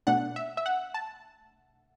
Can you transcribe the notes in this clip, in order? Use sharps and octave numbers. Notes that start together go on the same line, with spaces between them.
B2 A3 D4 F#5
E5
E5
F#5
A5